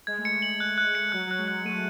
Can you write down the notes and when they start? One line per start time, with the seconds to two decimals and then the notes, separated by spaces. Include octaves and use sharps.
0.07 G#3 G#6
0.18 A3
0.25 G#3 C#7
0.42 F#7
0.60 F#6
0.78 F#6
0.95 C#7
1.12 F#3 F#6
1.27 F#3 F#6
1.39 G#3
1.48 F#6
1.65 A3 D#7